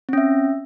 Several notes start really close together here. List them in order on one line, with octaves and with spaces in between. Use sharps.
C4 C#4 E5